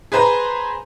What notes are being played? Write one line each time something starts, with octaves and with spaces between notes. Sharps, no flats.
G#4 B4 C5 A#5 C6